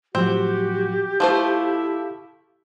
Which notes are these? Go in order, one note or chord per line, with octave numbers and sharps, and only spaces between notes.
A2 F3 F#3 C4 F#4 G4
F3 A3 E4 C5 F5